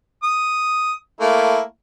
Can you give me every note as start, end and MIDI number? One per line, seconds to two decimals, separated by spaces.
0.23 0.93 87
1.21 1.60 57
1.21 1.60 58
1.21 1.60 64